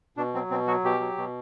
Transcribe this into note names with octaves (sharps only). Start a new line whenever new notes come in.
B2 D4
F#3 C4
B2 C4
F#3 F#4
B2 G4
F#3
B2